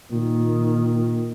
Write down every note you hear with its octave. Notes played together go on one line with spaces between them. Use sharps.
A#2 D#3